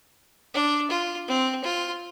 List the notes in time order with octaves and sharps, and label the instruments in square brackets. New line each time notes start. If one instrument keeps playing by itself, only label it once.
[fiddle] D4
F4
C4
F4